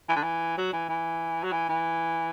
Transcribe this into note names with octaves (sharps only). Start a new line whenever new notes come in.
E3
D3
E3
F#3
E3
E3
F#3
E3
E3